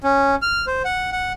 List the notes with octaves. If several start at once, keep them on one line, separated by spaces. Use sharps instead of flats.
C#4
F6
C5
F#5
F#5